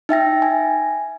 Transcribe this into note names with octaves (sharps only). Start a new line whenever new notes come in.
D#4 E5 G5 A#6
G#5